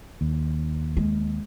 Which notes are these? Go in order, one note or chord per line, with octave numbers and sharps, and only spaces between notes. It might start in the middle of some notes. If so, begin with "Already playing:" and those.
D#2
G#3